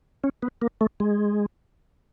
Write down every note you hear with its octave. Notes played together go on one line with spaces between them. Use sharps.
C#4
B3
A#3
A3
G#3